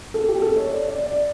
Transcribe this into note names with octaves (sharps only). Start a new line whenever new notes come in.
A4
G4
A4
C#5
D5
D5
D5